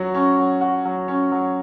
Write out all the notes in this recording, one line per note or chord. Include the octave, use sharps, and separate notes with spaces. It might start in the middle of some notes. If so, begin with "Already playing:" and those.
Already playing: F#3 F#4
C#4
F#3
F#4
F#3
C#4
F#3